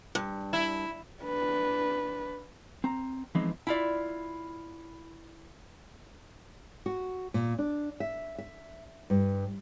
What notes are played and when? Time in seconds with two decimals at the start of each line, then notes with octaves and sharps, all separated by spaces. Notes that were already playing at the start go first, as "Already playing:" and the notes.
0.15 G2
0.53 E4
1.23 D4 B4
2.84 C4 A#5
3.35 E3 F3 G#3 B3 C4 D#4
3.67 E4 F4 D5
6.86 F#4
7.34 A#2
7.58 D4
8.00 E5
8.38 E5
9.10 G2